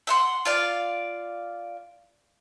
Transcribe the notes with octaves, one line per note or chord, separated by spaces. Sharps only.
E5 F#5 C6
F4 D5 F5